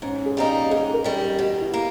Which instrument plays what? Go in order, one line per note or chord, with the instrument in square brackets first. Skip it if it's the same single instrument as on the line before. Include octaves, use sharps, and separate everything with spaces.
[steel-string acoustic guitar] G#2 [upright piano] C#4
[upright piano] G#4
[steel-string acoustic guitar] G3 A#3 D#4
[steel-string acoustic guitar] G#2 [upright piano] G#4
[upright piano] A#4
[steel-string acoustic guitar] D#3 G3
[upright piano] G4
[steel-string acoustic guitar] B2 [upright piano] G4
[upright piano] E4
[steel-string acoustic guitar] A#3